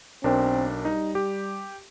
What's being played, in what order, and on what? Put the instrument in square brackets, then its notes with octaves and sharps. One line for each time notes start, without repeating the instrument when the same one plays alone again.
[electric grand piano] B1 D4 A#4 [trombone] C4
[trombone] G3 [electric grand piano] D#4
[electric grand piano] G4